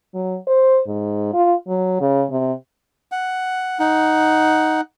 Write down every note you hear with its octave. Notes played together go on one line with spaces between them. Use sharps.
F#3
C5
G#2
F4
F#3
C#3
C3
F#5
D#4 F#5